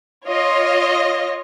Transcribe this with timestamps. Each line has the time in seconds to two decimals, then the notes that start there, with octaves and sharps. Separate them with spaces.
0.25 F4 C#5 D#5